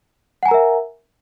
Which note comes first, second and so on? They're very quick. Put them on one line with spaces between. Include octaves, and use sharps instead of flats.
F#5 G#5 A#5 A#4 E5